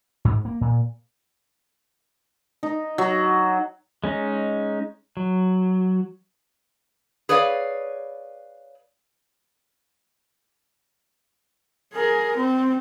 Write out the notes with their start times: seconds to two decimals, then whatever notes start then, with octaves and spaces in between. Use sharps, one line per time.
0.25 G#2
0.45 A#3
0.61 A#2
2.63 D#4
2.98 F#3
4.04 G#3 C#4 D#4
5.17 F#3
7.29 G#4 B4 C#5 D5 F5
11.93 G#4 A#4
12.37 C4